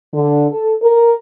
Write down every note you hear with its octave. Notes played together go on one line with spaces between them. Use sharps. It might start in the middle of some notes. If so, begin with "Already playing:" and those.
D3
A4
A#4